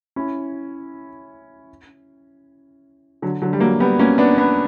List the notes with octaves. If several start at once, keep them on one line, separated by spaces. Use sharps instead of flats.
C#4 E4
D3 F#3
D3 F#3
G3
F#3 A#3
G3 B3
A#3 C#4
B3 D4
B3 D4